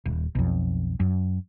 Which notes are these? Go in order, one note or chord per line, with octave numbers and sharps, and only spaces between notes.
D#1
B1 F2
F#2